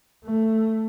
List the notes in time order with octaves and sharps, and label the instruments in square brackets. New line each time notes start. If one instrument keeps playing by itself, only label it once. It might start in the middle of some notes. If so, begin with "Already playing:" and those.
[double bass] A3